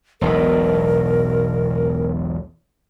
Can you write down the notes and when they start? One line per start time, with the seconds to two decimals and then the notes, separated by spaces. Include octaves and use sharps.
0.21 E1 B1 A2 A#4